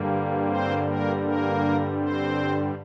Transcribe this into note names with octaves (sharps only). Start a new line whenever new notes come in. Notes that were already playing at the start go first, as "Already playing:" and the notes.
Already playing: G2 D3 G3 A#3
C4 C5
A#3 A#4
A#3 A#4
C4 C5